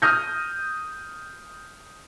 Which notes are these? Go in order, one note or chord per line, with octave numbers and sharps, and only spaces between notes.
D#6 F6 G6 A#6